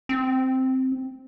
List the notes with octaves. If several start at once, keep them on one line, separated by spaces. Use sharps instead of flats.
C4